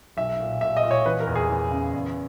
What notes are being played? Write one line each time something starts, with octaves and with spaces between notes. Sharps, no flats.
B1 E5
A#2
A#2 E5
D#5
A#2
C#5
E3 B4
A#4
E2
G#4
E3
C#3
E2